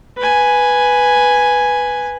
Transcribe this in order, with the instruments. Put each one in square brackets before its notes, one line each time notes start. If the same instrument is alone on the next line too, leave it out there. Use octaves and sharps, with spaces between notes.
[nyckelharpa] B4 G#5